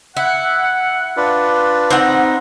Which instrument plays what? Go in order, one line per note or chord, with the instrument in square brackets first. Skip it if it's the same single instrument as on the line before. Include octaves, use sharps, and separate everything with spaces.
[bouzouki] E4 [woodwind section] F#5
[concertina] D4 F4 B4
[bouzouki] C4 F#5 [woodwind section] D#4